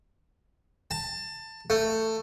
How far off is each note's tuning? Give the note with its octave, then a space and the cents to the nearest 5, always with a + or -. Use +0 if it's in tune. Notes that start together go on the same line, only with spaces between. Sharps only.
A5 +20
A3 +15